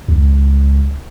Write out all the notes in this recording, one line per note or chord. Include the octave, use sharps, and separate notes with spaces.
C#2